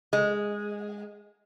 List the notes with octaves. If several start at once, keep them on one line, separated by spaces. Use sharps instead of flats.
G#3